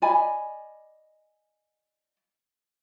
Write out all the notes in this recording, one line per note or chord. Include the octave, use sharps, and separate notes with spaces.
D5 D#5 G#5 B5